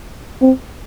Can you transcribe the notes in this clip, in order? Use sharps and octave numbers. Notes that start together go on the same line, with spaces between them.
C4